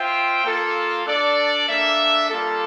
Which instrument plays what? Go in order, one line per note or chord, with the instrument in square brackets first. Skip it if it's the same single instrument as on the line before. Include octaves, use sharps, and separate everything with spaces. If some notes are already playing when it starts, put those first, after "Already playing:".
Already playing: [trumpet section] F4 C5 E5 G5
A#3 F4 A4
D4 A4 D5
A#3 D4 A4 E5
G3 A#3 F4 A4